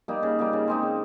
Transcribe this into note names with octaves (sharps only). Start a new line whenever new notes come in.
G3 A#3 D#4
C#3
G3 A#3 D#4
C#3
G#3 C4 D#4
C#3